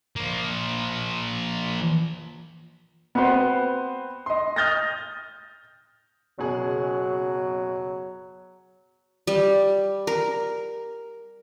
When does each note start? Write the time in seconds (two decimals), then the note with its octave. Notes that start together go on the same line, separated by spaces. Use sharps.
0.16 F3 A#3
3.15 B3 C4 F#4 B4 C5
4.26 D#5 C6
4.56 D#6 F6 G6 A6 A#6
6.39 F#1 B2 F#3 G#4
9.27 G3
10.07 A#4